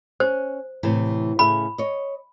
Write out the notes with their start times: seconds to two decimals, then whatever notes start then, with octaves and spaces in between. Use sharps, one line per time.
0.20 C#4 C5
0.83 A2 C3 E3
1.39 A2 C#3 E5 B5
1.78 C#5 D#5